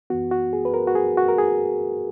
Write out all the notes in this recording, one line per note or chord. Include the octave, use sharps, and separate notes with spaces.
F#2 E3 B3 F#4
F#4
G#4
B4
A#4
F#4
G#4
F#4
A#4
G#4